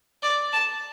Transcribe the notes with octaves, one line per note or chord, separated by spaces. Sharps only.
D5
A5